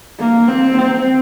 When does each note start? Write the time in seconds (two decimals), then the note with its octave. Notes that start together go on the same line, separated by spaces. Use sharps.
0.19 A#3
0.48 C4
0.77 C4